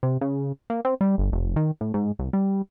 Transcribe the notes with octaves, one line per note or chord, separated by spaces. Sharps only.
C3
C#3
A#3
C4
G3
G1
F1
D#3
A2
G#2
C2
G3